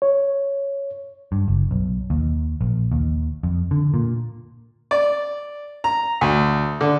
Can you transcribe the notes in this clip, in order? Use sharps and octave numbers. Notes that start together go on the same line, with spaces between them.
C#5
G2
F#1
B1
D#2
A#1
D#2
F2
D3
A#2
D5
A#5
D2
D3